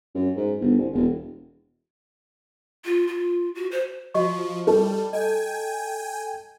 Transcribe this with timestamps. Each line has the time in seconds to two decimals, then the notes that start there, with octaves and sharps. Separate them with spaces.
0.15 F#2
0.36 G#2
0.61 G1
0.78 C2
0.93 E1
2.85 F4
3.08 F4
3.55 F#4
3.71 C5
4.14 F3 F#4 D#5 C#6
4.67 G3 A4
5.13 D#5 G5 G#5